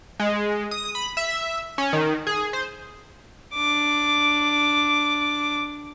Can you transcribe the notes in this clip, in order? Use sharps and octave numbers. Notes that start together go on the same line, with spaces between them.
G#3
D#6
B5
E5
C#4
D#3
G#4
C5
D4 D6